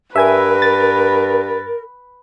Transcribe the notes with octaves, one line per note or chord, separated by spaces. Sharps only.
G2 A#4 B4 E5 G#5 G#6
A6